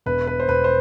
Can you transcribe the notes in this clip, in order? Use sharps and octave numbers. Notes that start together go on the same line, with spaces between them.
E1 B4
B4
C5
E1 B4
C5